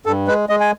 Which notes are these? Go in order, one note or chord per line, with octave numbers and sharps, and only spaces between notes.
G2 A4
G#3 B4
G#3 D#5
G#5